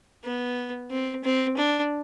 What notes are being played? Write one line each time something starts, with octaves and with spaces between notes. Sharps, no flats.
B3
C4
C4
D4